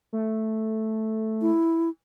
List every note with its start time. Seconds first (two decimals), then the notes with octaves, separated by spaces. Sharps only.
0.13 A3
1.42 E4